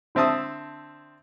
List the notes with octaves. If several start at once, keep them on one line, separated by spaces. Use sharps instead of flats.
D3 C4 E5 A5 D#6